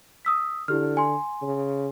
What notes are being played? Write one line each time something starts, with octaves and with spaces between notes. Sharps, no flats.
D#6 E6 B6
D3 E4 G4 F6
G#5 C6
C#3